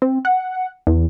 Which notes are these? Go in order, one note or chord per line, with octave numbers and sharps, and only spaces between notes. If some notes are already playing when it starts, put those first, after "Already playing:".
C4
F#5
E2